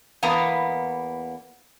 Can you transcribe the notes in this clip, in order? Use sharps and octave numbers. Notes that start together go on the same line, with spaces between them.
E2 A#3 B3 A#5